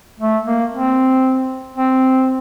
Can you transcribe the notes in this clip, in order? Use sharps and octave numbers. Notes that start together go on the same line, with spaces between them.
A3
A#3
C4
C4